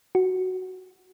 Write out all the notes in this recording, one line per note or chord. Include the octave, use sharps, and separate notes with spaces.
F#4